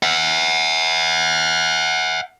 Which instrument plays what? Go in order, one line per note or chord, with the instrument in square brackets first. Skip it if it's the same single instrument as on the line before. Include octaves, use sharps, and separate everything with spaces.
[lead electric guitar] E5 F#5